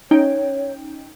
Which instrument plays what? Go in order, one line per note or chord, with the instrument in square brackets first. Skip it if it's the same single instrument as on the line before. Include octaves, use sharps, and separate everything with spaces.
[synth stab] C#4 D#4 G5 [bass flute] C#5